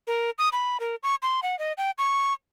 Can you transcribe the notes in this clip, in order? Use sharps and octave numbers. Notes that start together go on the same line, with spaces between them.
A#4
D#6
B5
A#4
C#6
C6
F#5
D#5
G5
C#6